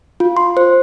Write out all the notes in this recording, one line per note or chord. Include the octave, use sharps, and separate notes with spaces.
F4
C6
C5